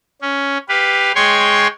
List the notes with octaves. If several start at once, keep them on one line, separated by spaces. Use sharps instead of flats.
C#4
G4 B4 F5
G#3 C#5 G5 C6 C#6